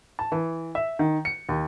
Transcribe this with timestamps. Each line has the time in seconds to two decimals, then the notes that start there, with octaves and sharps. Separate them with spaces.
0.19 A5
0.32 E3
0.75 E5
0.99 D#3
1.25 C#7
1.49 D#2